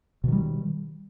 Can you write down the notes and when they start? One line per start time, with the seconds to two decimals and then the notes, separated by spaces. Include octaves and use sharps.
0.24 B2
0.28 D#3
0.32 G3